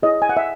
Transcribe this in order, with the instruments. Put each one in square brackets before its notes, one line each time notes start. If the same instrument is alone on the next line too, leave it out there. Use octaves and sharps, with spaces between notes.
[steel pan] E4 G#4 C#5 D#5
G#5
F#5
E5